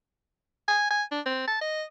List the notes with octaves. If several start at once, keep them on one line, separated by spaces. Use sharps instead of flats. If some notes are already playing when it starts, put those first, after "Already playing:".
G#5
G#5
D4
C4
A5
D#5